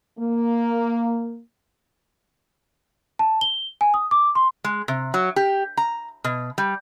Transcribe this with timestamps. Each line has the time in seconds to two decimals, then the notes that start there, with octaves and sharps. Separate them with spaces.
0.18 A#3
3.19 A5
3.41 G7
3.81 G#5
3.94 D#6
4.11 D6
4.35 C6
4.64 G#3
4.88 C3
5.14 F#3
5.36 G4
5.77 A#5
6.24 B2
6.58 G3